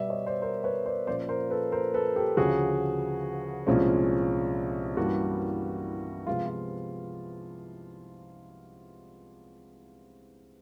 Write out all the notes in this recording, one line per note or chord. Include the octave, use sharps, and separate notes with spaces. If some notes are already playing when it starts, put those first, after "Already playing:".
Already playing: B2 G3 B3 D5 E5
C#5 D#5
C5 D5
A#4 C5
B4 C#5
C5 D5
A#2 F3 A#3 C#4 C5 D5
A#4 C5
A4 B4
A#4 C5
A4 B4
G4 A4
D2 C#3 F3 F#4 G#4
C2 A#2 F3 G#3 C#4
G2 E3 G3 A#3 C#4 F#4
C3 F3 G#3 B3 F4
F4